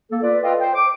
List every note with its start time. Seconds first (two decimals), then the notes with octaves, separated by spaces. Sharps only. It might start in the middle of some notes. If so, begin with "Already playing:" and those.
0.10 A#3 A4
0.22 F4 B4 D5
0.44 F4 A4 B4 D#5 F5 G5
0.60 C5 G5
0.75 D6